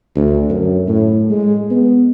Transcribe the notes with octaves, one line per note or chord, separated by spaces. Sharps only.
D2
F#2
A2
G#3
B3